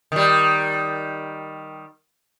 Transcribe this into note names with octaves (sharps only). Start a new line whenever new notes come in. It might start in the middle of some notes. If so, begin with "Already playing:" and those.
D#3 G3